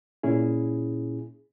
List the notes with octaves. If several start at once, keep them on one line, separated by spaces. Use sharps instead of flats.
A#2 C#4 E4 G#4